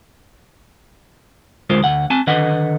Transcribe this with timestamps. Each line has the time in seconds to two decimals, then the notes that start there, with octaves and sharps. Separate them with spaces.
1.70 D2 G#3 F4 A#4 C5
1.84 D2 F#5
2.10 C4 G#5 A5
2.27 D3 D#3 B4 D#5 F#5